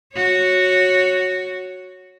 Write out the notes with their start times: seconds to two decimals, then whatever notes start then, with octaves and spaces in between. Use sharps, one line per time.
0.14 F#4 C#5